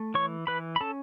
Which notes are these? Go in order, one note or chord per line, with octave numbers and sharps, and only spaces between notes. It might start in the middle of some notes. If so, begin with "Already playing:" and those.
Already playing: A3
E3 C#5 C#6
E3 B4 B5
B5
C#4 A4 A5